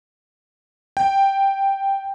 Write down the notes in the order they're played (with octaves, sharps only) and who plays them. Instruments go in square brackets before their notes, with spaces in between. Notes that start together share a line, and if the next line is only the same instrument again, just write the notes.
[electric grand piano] G5